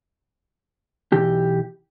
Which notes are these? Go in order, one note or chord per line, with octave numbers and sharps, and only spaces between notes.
B1 E3 G4